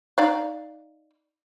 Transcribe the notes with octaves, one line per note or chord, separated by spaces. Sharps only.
D#4 D5 F5